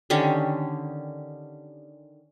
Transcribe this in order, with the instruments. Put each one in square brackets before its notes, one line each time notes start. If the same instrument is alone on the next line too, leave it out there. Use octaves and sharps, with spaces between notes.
[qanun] D3 D#3 C#4 G4